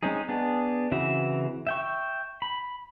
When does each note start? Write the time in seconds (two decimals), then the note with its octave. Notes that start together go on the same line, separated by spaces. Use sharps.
0.03 G#3 C4 C#4 D#4 G#4
0.29 B3 D4 G#4
0.91 C#3 E3 C4 F#4 E5
1.67 E5 G5 C#6
2.42 B5